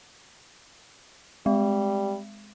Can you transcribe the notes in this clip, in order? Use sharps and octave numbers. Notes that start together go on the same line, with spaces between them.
G3 G#3